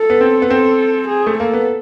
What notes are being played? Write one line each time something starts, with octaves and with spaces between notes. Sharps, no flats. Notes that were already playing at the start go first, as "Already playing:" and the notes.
Already playing: A4
B3
C4
B3
C4 A4
G#4
A3
A#3 A4
B3